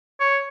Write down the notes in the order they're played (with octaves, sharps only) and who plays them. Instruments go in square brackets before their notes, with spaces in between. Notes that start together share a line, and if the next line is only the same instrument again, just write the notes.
[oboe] C#5